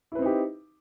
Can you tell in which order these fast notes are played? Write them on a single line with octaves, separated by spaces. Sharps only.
E4 B4 C4 D#4 G4